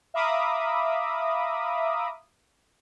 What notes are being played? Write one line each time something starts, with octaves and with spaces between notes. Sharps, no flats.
E5 F5 A#5 B5 D6 D#6